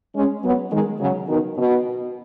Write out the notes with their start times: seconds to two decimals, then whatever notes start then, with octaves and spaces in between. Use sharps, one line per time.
0.15 G#3 C#4
0.43 F#3 B3
0.71 D#3 G#3
1.00 C#3 F#3
1.29 B2 D#3
1.58 B2